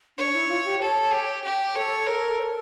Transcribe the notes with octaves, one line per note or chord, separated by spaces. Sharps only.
D4 C#5
E4
F4
G4
A4 C#5
G4
G4
A4 C#5
A4 A#4
C#5
A4